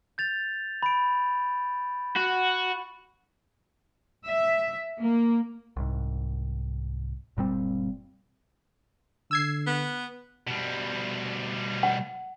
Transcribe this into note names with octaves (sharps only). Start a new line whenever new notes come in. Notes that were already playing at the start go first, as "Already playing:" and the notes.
G6 A6 F7
B5 D7
F#4
E5
A#3
C2 G#2
F#1 A#2 G3 C4
D3 E6 G#6 C7
B3
B2 G3
F#5